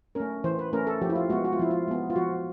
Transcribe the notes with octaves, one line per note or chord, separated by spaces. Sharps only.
A3 C#4 A#4
E3 C5
B4
A3 C#4 A#4
A4
F3 G4
E4
F4
G#3 B3 F#4
F#4
F4
F3 E4
F4
G#3 B3
F4
F3 F#4